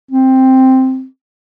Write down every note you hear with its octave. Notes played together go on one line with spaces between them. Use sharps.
C4